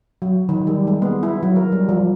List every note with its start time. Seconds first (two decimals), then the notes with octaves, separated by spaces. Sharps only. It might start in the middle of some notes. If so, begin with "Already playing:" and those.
0.22 F#3
0.49 D#3
0.67 G3
0.87 G#3
1.02 B3
1.23 E4
1.43 F#3
1.56 A#4
1.72 G3
1.89 F3